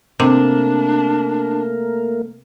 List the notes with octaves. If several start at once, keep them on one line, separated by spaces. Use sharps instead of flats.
C3 A3 A#3 D4 A#4